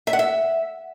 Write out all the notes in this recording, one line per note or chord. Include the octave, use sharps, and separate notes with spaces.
E5
F#5
E5